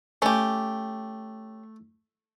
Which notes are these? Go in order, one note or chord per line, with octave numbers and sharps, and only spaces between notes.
A3 C#4 G4